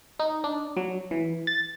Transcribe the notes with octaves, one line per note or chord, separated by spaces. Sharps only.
D#4
D4
F#3
E3
A6